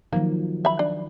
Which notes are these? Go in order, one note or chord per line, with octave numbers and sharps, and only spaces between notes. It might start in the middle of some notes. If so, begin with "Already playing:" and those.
D#3 F3 F#3 A#3
E5 B5
D4